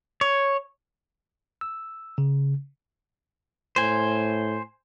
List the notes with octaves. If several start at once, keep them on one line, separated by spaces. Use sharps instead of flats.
C#5
E6
C#3
A2 C5 G#5